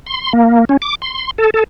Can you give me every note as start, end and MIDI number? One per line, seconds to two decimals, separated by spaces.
0.06 0.33 84
0.33 0.65 58
0.69 0.77 61
0.82 0.95 86
1.02 1.31 84
1.38 1.50 69
1.54 1.64 69